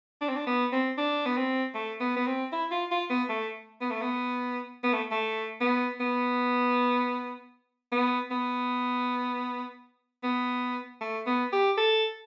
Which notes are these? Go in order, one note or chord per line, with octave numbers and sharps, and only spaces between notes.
D4
C4
D4
B3
C4
D4
B3
C4
A3
B3
B3
C4
E4
F4
F4
B3
A3
B3
A3
B3
B3
A3
A3
B3
B3
B3
B3
B3
A3
B3
G4
A4